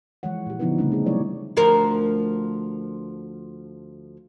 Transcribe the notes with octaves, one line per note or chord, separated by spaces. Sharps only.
E3 F3 G#3 C#5 F#5
A#2 G4
D3 F3 B3 D#4 E4 B4
C#3 F3 G3 A3 C4 D4
E3 D#4 G#4
F#3 G3 E4 C#5 D5
D2 F3 A#4